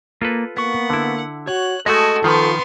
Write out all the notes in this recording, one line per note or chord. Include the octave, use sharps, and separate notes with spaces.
A#3 F4 A4 B4
A#3 B3 F#5 C#6
D3 E4
F#4 C#5 F#6
G#3 A3 F#4 A4 D#5 G#5 A5 D#6
D#3 F3 B3 F4 C6 C#6